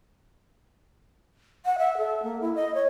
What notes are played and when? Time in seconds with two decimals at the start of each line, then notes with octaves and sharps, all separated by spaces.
1.65 F#5
1.78 E5
1.98 A4
2.23 A#3
2.41 E4
2.55 D#5
2.75 C#5